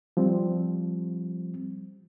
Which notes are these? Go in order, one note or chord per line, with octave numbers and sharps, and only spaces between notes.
F3 G3 C4